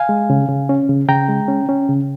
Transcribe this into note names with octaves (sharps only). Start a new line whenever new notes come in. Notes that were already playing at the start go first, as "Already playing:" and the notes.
Already playing: F5 G#5
G#3
C#3
C#3
C#4
C#3
C#3 G5 A#5
G#3
C#4
C#4
C#3